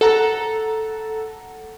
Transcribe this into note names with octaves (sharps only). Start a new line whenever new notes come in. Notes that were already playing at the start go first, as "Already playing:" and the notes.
A4 F#5 A#5